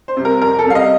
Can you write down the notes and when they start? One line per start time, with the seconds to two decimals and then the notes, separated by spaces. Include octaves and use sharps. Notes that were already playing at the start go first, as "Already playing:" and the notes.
0.08 C5
0.17 C3 G3
0.25 A#4
0.42 F2 A#4
0.59 A4
0.66 C3 G3 F5
0.75 D#5